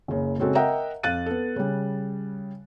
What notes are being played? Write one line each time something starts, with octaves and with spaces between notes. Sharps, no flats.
F#1 C#3
C#3 G#3 C4 F#4 A4
A#4 D#5 E5 F#5 G5 A#5
F2 F5 F#6 A6 D#7
B3 A4
C#3 G3